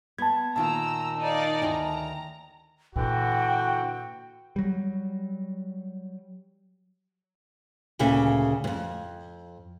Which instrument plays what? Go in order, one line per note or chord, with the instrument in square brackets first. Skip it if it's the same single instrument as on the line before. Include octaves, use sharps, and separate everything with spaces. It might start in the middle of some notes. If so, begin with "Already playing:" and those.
[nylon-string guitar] B3 [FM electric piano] A5 G#6
[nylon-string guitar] A#2 D#3 F4 [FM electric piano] A5 [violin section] A#5 E6
[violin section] D#4 D5 F5
[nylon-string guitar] D2 D#3 G#5 [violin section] A#5
[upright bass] A#2 [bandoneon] D3 E3 [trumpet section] F#4 [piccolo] G5
[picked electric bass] F#3 G3
[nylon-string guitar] D2 A#2 C#3 A4 E5
F2 G#2